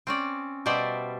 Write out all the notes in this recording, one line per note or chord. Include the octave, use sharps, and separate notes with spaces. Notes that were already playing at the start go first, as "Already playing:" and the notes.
C4 C#4 D5
B2 G3 C5 D5 E5